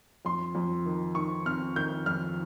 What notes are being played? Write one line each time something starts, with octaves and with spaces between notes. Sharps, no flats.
F2 C6
F2
D#3
D#3 C#6
C4 F6
D#3 G6
F2 F6